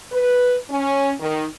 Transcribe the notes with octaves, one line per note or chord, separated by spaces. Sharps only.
B4
C#4
D#3